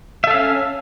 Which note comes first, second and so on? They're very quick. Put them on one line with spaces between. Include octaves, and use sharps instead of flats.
E5 A4 F5 C#4